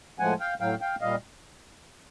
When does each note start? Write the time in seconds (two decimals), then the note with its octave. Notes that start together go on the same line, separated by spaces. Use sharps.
0.19 A2 F3 G#3 F#5 G#5
0.40 F5 G5
0.60 A2 F#3 F5 G5
0.81 F5 G5
1.01 A#2 G3 D#5 F5